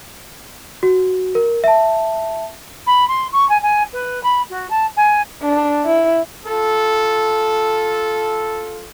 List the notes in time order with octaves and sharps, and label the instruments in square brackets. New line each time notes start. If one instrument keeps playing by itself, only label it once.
[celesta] F#4
A#4
E5 A5
[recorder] B5
C6
C#6
G#5
G#5
B4
B5
F#4
A5
G#5
[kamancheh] D4
E4
[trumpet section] F4 A4